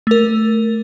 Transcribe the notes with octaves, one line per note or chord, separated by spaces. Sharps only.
A3 A#4